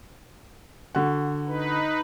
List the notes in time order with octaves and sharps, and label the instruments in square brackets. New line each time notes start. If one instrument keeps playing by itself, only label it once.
[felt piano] D3 F#4 F#5
[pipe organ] D#4 B4